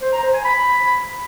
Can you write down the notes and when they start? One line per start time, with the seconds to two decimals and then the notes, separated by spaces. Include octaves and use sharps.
0.02 C5
0.13 A#5
0.23 C5
0.34 G#5
0.45 B5